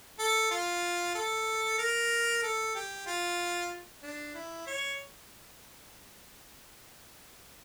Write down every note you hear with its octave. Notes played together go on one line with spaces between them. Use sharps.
A4
F4
A4
A#4
A4
G4
F4
D4
E4
C#5